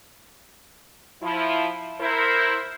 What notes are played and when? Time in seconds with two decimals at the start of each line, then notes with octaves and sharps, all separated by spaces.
1.22 F3 E4
2.01 E4 A#4 C5